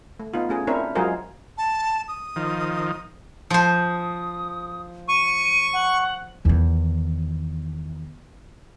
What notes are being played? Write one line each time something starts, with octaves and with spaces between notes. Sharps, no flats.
A3
B3 D#4 F4
A3 C#4 G#4
C4 D4 E4 A#4 C#5
F#3 G#3 F4 G#4 A#4 C5
A5
D#6
D#3 F3
F3 C5 D#6
C#6 D#7
F#5
E2 D#3